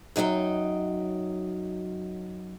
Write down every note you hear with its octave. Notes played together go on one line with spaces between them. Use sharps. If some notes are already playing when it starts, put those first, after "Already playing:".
F#2 F#3 D#4 D#5 G5